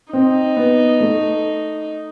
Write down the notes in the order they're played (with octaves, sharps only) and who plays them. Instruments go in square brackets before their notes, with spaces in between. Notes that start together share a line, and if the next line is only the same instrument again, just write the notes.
[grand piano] C4 [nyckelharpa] D#4
[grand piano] B3
A3